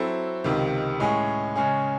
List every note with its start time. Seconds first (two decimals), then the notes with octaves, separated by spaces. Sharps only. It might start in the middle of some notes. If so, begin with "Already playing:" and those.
Already playing: F#3 C4 E4 A4
0.44 C#2 C3 D#3
1.00 A2 G#3 C#4 G#4
1.56 C#3 G#3 C#4 G#4